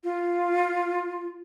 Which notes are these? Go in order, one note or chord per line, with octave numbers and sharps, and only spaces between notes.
F4